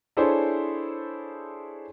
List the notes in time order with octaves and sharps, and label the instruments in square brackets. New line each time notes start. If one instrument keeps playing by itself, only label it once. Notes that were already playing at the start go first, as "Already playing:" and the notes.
[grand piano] D4 E4 G#4 A4 C5 C#5